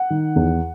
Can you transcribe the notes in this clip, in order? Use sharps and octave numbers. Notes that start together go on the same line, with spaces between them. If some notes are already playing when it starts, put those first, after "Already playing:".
Already playing: F#5
D#3
E2